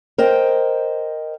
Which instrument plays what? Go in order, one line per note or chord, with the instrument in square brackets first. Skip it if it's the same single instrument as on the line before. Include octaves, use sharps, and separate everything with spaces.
[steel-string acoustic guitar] A#4 C5 D#5 G5